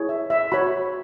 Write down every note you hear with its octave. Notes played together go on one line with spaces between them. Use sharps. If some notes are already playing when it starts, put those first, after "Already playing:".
Already playing: E4 G#4 C#5
E5
E5
F#4 C#5 B5